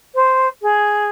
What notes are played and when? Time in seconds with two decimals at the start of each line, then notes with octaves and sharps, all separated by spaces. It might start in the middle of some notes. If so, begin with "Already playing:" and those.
0.15 C5
0.62 G#4